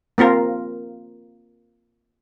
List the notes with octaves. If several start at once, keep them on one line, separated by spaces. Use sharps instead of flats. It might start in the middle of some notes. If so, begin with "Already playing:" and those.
A#3 C4 F4 A#4